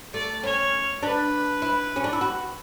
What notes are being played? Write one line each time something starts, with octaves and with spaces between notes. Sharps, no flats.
A3 D5
C#4 C#5
D4 B4
E4
C#4
D4
E4
F#4